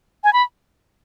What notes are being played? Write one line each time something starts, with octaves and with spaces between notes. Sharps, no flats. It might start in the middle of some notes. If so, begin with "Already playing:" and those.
G#5
B5